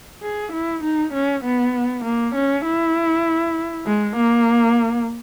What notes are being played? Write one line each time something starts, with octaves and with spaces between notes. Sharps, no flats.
G#4
E4
D#4
C#4
B3
A#3
C#4
E4
G#3
A#3